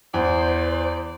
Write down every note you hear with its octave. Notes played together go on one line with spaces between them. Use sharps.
E2 C5 D5